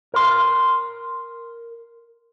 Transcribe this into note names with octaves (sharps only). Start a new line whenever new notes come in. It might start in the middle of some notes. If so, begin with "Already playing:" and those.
A#4 C6